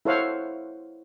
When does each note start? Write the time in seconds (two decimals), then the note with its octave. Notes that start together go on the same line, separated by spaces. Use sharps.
0.05 E4 A4 C5 C#5 F5 F#5